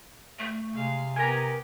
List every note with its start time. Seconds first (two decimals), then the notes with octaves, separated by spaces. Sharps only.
0.39 A3
0.73 C3 G#3 F5
1.16 B3 G4 A#4 G#5 A#5